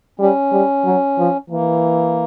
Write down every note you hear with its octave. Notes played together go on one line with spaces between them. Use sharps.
G3 C#4
G3
F#3
F3
E3 A#3